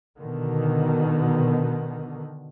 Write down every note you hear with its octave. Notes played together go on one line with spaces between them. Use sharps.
B2 D3 D#3